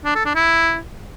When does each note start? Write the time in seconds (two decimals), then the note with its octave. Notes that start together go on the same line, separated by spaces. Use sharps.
0.05 D4
0.15 A4
0.25 D4
0.35 E4